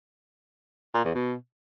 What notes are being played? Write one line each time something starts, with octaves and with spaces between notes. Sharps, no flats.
A#2
E2
B2